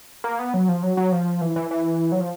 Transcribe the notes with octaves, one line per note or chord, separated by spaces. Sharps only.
A#3
B3
F#3
F3
F#3
F#3
F3
E3
E3
E3
F#3
F3